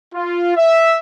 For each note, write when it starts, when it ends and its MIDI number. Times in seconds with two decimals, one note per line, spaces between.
0.14 0.54 65
0.56 0.98 76